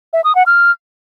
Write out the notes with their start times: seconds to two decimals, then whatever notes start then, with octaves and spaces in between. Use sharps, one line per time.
0.13 E5
0.24 D#6
0.35 F#5
0.46 F6